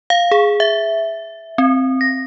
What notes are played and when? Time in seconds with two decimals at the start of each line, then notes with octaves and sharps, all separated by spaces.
0.10 F5
0.31 G#4
0.60 E5
1.58 C4
2.01 A#6